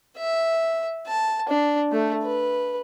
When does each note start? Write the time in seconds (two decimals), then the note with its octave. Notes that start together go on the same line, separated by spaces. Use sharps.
0.18 E5
1.07 A5
1.48 D4
1.92 A3
2.24 B4